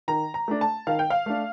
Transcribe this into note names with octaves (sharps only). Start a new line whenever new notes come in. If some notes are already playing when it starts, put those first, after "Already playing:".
D#3 A#5
A#5
A3 D4
A5
D#3 F5
G5
F5
A3 D4